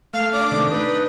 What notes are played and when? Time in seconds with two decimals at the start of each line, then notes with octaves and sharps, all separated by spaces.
0.14 A3 F5 F6
0.33 D4 D6
0.51 C3 D#3 A3
0.71 D#4 B4